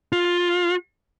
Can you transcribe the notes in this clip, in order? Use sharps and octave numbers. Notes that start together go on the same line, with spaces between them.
F4